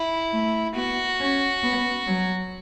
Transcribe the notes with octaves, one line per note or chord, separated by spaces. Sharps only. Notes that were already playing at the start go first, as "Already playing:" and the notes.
Already playing: E4
A3
B3 F#4
C#4
B3
F#3